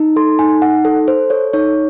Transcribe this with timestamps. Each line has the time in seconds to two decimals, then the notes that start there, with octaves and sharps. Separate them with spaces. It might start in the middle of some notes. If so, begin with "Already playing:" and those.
Already playing: D#4
0.16 A4 C6
0.39 D#4 G#5
0.62 D#4 F#5
0.85 A4
1.07 A4 C5
1.30 A4 C#5
1.53 D#4 C#5